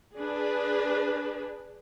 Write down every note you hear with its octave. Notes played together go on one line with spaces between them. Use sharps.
D4 G#4 B4